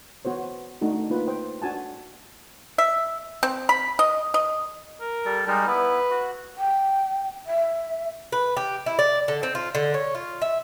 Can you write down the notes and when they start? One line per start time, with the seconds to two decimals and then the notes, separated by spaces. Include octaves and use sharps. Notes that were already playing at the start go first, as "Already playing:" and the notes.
0.25 B3 F#4 C5 C#5
0.82 A3 D4 D#4 F#4
1.10 A#3 D#4 F4 B4
1.27 C5 G5
1.62 D4 F#4 G#5 A5
2.78 E5
3.43 C4
3.69 B5
3.99 D#5
4.34 D#5
5.00 A#4
5.25 G3 A4
5.47 G3 G#3 D#4 A#4
5.67 B3 E4 B4
6.10 F#4
6.58 G5
7.46 E5
8.32 B4
8.57 G4
8.86 E4
8.99 D5
9.28 D3
9.43 C4
9.55 F4
9.75 D3
9.94 C#5
10.15 F4
10.42 E5